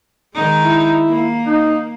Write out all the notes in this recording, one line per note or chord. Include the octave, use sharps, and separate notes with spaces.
D#3 G#3 D#4
E4
A#3
D#4